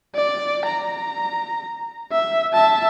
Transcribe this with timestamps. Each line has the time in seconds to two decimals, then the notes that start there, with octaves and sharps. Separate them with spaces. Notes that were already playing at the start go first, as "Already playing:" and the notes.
0.15 D5
0.66 A#5
2.12 E5
2.53 E5 A5